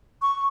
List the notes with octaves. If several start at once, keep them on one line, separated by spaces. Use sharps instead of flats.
C#6